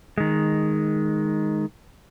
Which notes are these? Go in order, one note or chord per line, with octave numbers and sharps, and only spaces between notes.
D#3 G#3